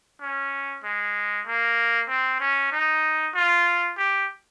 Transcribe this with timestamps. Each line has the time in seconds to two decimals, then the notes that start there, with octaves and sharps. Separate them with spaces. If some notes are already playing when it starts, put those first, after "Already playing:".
0.21 C#4
0.84 G#3
1.47 A#3
2.08 C4
2.40 C#4
2.72 D#4
3.34 F4
3.97 G4